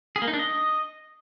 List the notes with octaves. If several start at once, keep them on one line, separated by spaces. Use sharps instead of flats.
G#4
A#3
D#4
D4
D#5